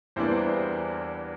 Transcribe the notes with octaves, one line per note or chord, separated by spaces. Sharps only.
E2 E3 G3 A#3 D4 C5